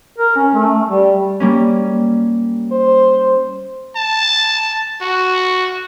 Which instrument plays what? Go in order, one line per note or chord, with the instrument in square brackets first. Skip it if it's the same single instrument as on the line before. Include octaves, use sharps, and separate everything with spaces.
[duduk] A#4
C#4
A3
G3
[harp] G3 A#3 C#4
[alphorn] C5
[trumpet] A5
F#4